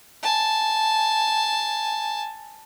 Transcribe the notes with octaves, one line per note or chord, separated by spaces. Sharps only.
G#5 A5